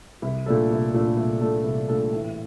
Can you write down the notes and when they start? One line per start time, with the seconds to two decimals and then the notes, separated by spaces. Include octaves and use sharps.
0.22 C2
0.46 A#2 A3 D4 A4
0.71 C2
0.94 A#2 A3 D4 A4
1.17 C2
1.41 A#2 A3 D4 A4
1.64 C2
1.88 A#2 A3 D4 A4
2.12 A1